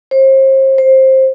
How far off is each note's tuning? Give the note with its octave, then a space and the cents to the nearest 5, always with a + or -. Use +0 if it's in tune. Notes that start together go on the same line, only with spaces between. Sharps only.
C5 +35
C5 +15